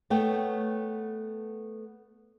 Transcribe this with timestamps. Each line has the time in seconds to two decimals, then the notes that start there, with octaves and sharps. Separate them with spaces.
0.10 A3 B3 C#5 G5